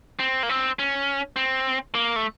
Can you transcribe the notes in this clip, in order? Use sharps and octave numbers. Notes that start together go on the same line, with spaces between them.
C4
A#3
C4
C#4
C4
A#3
A3